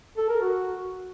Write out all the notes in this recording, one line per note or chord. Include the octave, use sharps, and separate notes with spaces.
A4
A#4
F#4